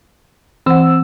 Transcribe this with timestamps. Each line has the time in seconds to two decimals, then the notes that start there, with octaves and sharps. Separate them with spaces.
0.66 E3 C4 F#5 E6